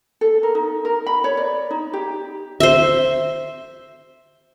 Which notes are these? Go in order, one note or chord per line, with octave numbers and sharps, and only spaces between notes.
A4
A#4
D#4
A#4
B5
C#5
D5
D#4
G4
C5 E5